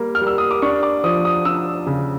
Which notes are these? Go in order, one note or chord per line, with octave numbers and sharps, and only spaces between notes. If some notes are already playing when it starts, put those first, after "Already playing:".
Already playing: G3 A#3
F6
G3
E6
D#6
D6
D4 C#6
D6
F3 D#6
D#6
D4 E6
C#3